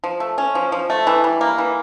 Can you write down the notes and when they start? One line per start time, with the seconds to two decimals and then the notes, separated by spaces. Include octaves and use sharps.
0.04 F3
0.20 A3
0.38 C#4
0.55 F3
0.72 F3
0.90 A3
1.07 E3
1.24 G3
1.41 A#3
1.58 E3